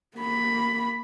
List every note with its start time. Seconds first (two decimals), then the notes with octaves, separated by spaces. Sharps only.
0.17 A#3 B5